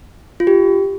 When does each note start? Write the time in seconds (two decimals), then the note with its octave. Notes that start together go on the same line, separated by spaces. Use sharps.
0.40 F4
0.47 G4